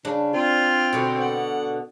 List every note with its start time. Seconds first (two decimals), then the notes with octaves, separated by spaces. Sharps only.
0.05 C#3 D4
0.33 C4 F4
0.93 B2 D3
1.19 F#5